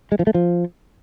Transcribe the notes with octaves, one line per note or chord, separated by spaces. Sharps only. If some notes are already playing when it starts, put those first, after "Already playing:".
G#3
F3
A3
F3